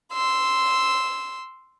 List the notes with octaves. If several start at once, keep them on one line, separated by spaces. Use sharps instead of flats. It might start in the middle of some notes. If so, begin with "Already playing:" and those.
C6 E6